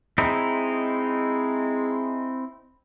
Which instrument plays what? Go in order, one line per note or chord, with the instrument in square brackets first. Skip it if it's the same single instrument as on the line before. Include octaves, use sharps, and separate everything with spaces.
[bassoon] G#3 [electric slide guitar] C4 D#4 E4